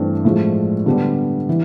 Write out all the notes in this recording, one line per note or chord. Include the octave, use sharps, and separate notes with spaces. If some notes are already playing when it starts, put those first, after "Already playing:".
Already playing: G2 E3 A3 C4
A2 F3 G#3
D3 G3 B3 D4
E3